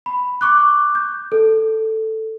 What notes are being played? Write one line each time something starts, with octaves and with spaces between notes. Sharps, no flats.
B5
C#6 D6 F#6
G6
A4